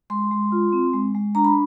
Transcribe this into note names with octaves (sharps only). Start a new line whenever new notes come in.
G#3 C6
G#3
F4
C4
G#3
G#3
D4 A#5
B5